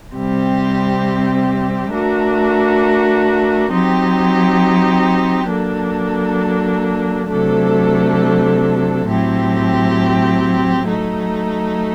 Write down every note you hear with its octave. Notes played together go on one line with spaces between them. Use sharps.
C3 G3 C4 G4
A3 D4 F#4 A#4
F#3 C4 D#4 G4
F#3 A#3 D4 A4
C3 F#3 A3 D4 A4
A2 F#3 C4 G4
F#3 A3 D#4